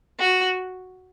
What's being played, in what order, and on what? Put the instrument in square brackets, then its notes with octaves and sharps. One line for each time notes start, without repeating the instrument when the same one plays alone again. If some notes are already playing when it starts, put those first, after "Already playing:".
[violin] F#4